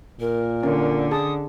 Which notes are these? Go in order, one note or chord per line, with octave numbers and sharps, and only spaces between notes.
A#2 A#4
D3 C#4
G#4 A5 D#6